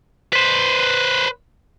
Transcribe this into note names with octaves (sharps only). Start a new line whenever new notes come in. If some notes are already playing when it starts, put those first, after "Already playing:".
B4 C5